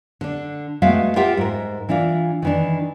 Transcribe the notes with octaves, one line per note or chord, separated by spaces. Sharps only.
D3 D4
G#3 A3 B3 F#4 E5 F5
F4 G4 A#4 E5 F#5 G5
G#2 A#4
E3 D4 E4 F4
D#3 E3 D4